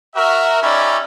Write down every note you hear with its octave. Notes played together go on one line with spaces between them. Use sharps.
F#4 A#4 E5
C#4 D#4 G4 D5 E5 B5